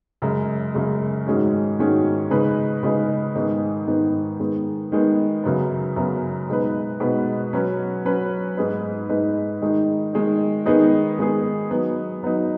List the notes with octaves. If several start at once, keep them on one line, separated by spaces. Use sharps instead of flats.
F#2 C#3 G#3
F#2 C#3 G#3
G#2 D#3 G#3 C#4 F#4
G#2 D#3 G#3 C#4 F#4
C#3 G#3 D#4 B4
C#3 G#3 D#4 B4
G#2 D#3 G#3 B3
G#2 D#3 G#3 B3
D#3 G#3 B3
D#3 G#3 B3
F#2 C#3 F#3 B3
F#2 C#3 F#3 B3
B2 G#3 D#4 B4
B2 G#3 D#4 B4
F#3 C#4 B4
F#3 C#4 B4
G#2 G#3 D#4 B4
G#2 G#3 D#4 B4
D#3 G#3 D#4
D#3 G#3 D#4
D#3 G#3 B3 D#4 G#4
D#3 G#3 B3 D#4 G#4
F#3 B3 D#4
F#3 B3 D#4